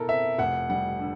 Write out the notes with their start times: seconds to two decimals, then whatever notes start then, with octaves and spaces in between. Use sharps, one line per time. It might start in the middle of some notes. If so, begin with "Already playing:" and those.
Already playing: B2 A3 E4 A4 A#4
0.09 C4 E5
0.39 F1 F#5
0.69 G3 F#5
0.99 D3